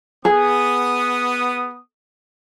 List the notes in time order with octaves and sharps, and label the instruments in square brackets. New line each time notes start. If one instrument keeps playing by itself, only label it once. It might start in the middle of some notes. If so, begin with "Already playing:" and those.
[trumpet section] B3 D#6 [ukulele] G#4